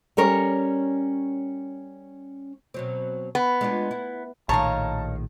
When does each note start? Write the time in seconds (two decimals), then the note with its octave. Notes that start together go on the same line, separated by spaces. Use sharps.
0.17 G3 C#4 A#4 C#5
2.74 B2 F#3 C4
3.35 B3
3.61 G#3 D4 F4
3.91 E4
4.49 A#1 A2 D#3 C#5 D#5 F5 A5 A#5